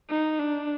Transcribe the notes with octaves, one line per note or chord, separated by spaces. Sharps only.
D#4
D4